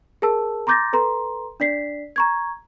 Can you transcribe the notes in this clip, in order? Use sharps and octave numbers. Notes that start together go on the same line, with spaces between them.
G#4 A#4 A5 E6
A#5 C6 D6 G6 A6 A#6
A4 B4 A#5 C6
D4 D5 B6 C7
A#5 C#6 G#6